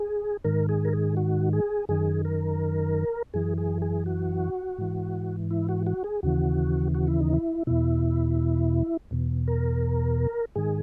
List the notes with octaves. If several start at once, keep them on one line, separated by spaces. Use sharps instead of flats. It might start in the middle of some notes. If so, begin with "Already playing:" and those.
Already playing: G#4
G#2 D#3 A#4
G#4
A#4
G#4
F#4
G#4
F#2 D#3 G#4
A#4
F#2 E3 G#4
G#4
G#4
F#4
G#2 E3
E4
F#4
F#4
G#4
D#2 C#3 E3 F#4
F#4
E4
D#4
E4
E2 B2 E4
E2 B2
A#4
G#2 D#3 G#4